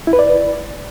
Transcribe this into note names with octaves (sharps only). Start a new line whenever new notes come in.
E4
B4
D5